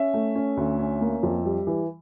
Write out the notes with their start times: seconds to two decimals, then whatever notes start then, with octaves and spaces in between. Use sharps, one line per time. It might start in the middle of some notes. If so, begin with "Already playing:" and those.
Already playing: C#4 E5
0.14 A3
0.35 C#4
0.57 D2
0.79 C#4
1.01 A#3
1.23 F2
1.45 G3
1.67 E3